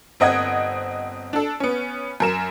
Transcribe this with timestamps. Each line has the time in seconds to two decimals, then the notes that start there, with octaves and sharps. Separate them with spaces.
0.20 G1 C4 D#5 F#5 G#6
1.33 D4 A4
1.60 B3 C#4
2.20 F#2 A#4 E7